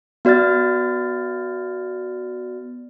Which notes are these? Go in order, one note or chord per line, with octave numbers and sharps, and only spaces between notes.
B3 F#4 D5 F6 A6